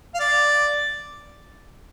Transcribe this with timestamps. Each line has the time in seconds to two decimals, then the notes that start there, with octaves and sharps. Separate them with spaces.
0.14 F5
0.20 D5